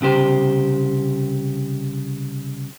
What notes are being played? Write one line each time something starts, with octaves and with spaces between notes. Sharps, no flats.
C2 C#3 G4 C5